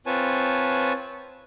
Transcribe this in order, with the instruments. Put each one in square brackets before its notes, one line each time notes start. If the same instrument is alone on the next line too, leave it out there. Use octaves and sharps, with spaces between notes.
[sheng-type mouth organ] C4 F4 B4 C#5 G#5 A5